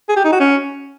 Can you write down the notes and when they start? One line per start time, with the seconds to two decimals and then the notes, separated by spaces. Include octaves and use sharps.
0.09 G#4
0.16 G4
0.24 D#4
0.32 F#4
0.40 C#4